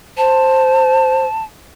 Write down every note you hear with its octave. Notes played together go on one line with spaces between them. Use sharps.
C5 A5